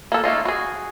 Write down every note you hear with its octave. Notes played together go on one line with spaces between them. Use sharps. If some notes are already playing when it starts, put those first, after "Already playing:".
A#3 A4
A3 A#3 D#4 F4
F#4 G#4